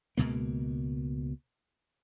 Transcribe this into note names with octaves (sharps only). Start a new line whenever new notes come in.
C#2 F#2 B2 A#3